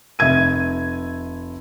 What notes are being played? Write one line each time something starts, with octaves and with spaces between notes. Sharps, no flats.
F1 E5 G#6 D#7